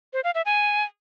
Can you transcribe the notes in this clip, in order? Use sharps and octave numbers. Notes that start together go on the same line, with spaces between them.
C5
F5
E5
G#5